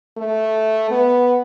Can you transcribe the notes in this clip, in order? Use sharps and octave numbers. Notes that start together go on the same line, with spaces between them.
A3
B3